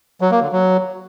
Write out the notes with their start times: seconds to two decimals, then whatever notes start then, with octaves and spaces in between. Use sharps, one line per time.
0.21 F#3
0.31 A#3
0.41 D3
0.52 F#3